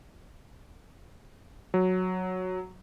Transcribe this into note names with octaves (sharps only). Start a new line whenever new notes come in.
F#3